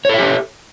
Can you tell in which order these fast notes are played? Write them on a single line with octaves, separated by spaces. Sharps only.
C#5 A4 E5 G4